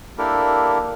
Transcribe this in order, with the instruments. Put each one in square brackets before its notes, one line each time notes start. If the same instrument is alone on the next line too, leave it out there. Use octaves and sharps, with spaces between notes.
[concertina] A#3 D4 E4 G4 A4 A#4